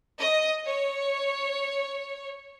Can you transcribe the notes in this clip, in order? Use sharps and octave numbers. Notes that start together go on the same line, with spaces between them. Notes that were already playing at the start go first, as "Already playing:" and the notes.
D#5
C#5